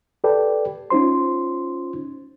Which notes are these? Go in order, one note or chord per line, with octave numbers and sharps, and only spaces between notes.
G4 A4 B4 D5 G5
C#4 D#4 F4 C5 C6